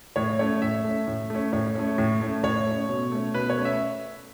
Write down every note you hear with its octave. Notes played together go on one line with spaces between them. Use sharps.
A2 C#5
A3 C#4 C#5
A2 E5
A3 C#4
A2
A3 C#4
A2 C#5
A3 C#4
A2
A3 C#4
A2 C#5
A3 C#4
B2
A3 C#4
B2 B4
C#5
A3 C#4
E5